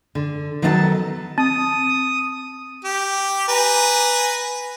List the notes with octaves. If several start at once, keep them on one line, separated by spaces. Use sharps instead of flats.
D3
D#3 F#3 B3 A4 D#5 A5
C4 D#6
G4
B4 G#5 A#5